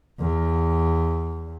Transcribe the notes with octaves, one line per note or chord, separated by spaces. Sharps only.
E2